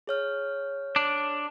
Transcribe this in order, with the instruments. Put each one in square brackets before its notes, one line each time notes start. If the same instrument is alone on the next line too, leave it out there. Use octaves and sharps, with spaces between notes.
[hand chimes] G#4 C#5 F6
[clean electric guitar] D4